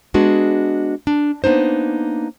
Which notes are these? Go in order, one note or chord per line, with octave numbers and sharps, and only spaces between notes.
G#3 B3 D4 F#4 G#4
D4
A#3 B3 D4 D#4 C5